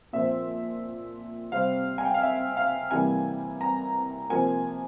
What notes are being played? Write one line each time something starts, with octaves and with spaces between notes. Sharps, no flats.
A#2 F3 C4 E5
C3 G3 C4 F5
G#5
G5
F5
E5
F5
C3 E3 G3 A#3 G#5
A#5
C3 F3 A#3 G#5